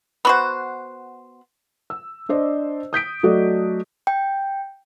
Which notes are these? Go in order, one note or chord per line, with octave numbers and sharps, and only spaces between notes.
B3 F#4 C5
E6
D4 C5 D5 D#5
D#6 G6 B6 D7
F#3 A3 F#4 A4 D5 D#5
G5